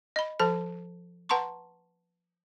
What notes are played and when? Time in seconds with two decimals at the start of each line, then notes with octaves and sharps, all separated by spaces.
0.16 D#5 B5
0.40 F3 A4 A5
1.29 B4 F#5 A5 A#5 C6 C#6